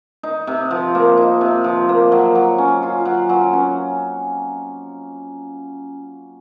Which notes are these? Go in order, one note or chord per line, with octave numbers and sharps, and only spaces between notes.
D#4
C3
F3
A#3
D#4
C3
F3
A#3
F#3
F#3
C#4
F4
F#3
F#3
C#4